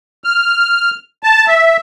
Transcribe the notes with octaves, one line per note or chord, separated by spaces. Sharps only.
F6
A5
E5